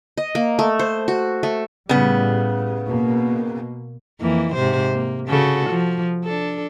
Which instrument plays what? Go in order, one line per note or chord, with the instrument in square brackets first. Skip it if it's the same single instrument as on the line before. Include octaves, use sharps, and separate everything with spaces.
[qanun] D#5
A#3
A3
C5
F#4
A3
[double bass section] A2 G3 [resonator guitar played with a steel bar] C#3 B3
[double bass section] B2 A#3
[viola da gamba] F2 E3 A#3
G#2 C3 C5
A#3
C#3 F#4 A4
F3
D4 A4